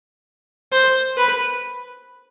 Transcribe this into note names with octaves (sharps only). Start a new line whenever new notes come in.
C5
B4